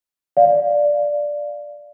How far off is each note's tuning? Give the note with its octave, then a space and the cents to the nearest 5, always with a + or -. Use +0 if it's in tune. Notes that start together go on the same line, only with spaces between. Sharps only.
D5 +0 F5 +0